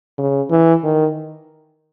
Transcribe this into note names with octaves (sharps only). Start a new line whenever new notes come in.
C#3
E3
D#3